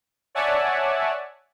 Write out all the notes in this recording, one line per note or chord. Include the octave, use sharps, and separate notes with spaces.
C#5 D5 E5 F#5 G#5 A5